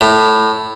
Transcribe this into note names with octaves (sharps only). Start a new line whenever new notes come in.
A2